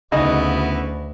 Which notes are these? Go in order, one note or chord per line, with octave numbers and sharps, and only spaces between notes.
D2 C#3 B3 D#4 E4 F#4